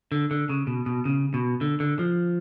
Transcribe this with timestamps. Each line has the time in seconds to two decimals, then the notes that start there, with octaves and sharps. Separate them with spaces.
0.12 D3
0.31 D3
0.50 C#3
0.67 B2
0.86 B2
1.05 C#3
1.34 B2
1.61 D3
1.80 D3
1.99 F3